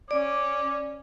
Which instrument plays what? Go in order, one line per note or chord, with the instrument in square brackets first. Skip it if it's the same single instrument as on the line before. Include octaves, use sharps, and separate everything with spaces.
[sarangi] C#4 [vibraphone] D5 [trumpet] D6